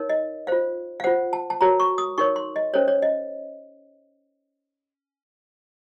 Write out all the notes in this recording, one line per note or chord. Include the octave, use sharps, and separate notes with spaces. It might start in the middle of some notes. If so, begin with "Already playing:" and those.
Already playing: D#4 A#4 C#5
D#5
F4 C5 F5
F5
F4 C5 F#5
A5
A5
F#4 A#4 C#5 A#5
C#6
D#6
D#4 A#4 C#5 C#6
C6
D#5
C#4 A4 C5 C#5
C#5
D#5